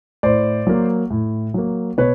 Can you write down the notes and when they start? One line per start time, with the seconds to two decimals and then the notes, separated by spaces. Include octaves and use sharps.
0.23 A2 C5 D5
0.67 F#3 A#3
1.11 A2
1.54 F#3 A#3
1.98 B2 B4 C#5